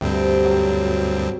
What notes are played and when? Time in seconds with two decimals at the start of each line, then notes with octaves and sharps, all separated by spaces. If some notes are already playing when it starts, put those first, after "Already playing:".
0.01 D2 G2 C3 C4
0.45 F#3